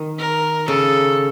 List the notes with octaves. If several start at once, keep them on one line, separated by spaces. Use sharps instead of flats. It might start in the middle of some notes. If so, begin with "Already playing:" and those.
Already playing: D#3
A#4
C#3 A4